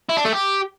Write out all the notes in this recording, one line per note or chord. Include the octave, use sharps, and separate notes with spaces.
E4
D4
A3
G4